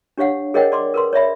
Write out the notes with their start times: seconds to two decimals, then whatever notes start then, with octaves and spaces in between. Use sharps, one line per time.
0.18 D4 G4 C#5 F5 F#5
0.54 G#4 A#4 C#5 D#5 F#5 G5
0.72 D5 C6 D6
0.94 A#4 B4 C6
1.13 C#5 D5 E5 B5